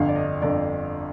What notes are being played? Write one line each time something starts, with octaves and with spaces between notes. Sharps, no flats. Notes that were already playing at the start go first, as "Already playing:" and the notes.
Already playing: G1 F2 D3 F5
D5
D#5
G1 F2 D3 D5